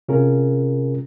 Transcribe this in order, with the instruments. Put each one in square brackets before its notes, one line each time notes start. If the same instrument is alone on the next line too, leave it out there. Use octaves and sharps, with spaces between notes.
[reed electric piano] C3 C#4 F4 G#4 A#4